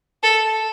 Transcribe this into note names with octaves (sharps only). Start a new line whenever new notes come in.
A4